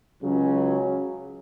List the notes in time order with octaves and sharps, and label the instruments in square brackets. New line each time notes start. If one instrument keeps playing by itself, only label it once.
[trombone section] C#2 C#3 F#3 C#4